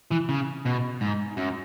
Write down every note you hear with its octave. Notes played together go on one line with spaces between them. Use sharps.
E3
C#3
B2
G#2
F#2